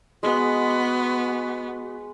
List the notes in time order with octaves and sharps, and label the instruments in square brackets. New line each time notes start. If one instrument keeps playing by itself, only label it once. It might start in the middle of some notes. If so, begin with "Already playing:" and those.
[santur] G#3 [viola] B3 [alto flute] F#4